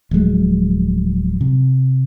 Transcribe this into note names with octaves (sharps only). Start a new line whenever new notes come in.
D1 F3 F#3 G#3
C3